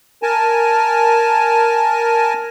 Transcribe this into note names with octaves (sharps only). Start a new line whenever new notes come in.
A#4 G#5 A5